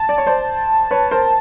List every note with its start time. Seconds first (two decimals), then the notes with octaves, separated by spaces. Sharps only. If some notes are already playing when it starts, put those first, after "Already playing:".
Already playing: A5
0.09 D5
0.18 C#5
0.27 C5 D5
0.91 B4 C#5
1.11 A#4 C5